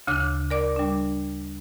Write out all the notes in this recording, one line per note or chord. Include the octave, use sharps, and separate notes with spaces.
D2 C#3 D6 F6 F#6
A#4 D5 D6
G3 D4